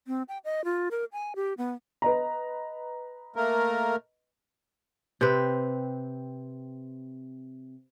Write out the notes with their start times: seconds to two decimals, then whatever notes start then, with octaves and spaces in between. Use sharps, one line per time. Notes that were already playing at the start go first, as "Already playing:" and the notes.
0.07 C4
0.28 G5
0.45 D#5
0.65 F4
0.91 A#4
1.13 G#5
1.36 G4
1.58 B3
2.02 B4 D#5 A#5
3.36 A3 A#3 A#4
5.21 C3 C4 B4